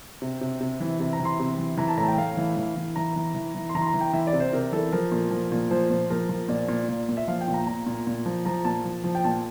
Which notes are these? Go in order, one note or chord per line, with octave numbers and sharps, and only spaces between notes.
C3
C3
C3
E3
C3
A#5
E3
C6
C3
E3
E3 A#5
A5
A2 A#5
A5
G5
A2 F5
E3
E3
E3
E3 A#5
E3
E3
E3
C6
E3 A#5
C6
A#5
E3
G5
E3 E5
D5
C3
C5
C3 A#4
E3 A4
F3 A#4
A#2
F3
A#2
F3 C5
A#2 C5
F3 A#4
F3
A#2 D5
A#2
A#2
A#2
E5
F3 F5
G5
A#2
A#5
A#2 A#5
A#2
A#2
F3
F3 A#5
A#2 A5
F3
F3
G5
A#2 A5